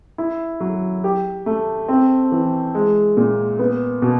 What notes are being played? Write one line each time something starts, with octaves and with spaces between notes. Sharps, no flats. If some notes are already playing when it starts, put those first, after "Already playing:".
E4
F#3
G4
A3
C4
E3
G#3
A#2
B3
B2